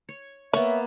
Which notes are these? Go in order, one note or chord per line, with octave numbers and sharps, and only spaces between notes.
C#5
A#3 B3 C#5 E5